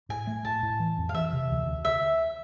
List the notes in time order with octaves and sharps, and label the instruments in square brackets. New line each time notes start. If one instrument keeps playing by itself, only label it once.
[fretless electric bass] A2 [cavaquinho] G#5
[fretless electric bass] A3
[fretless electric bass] A2 [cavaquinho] A5
[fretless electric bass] A2
E3
F2
[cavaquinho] F5
[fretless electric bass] E3 [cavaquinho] E5
[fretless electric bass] C3
D2
D2
[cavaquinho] E5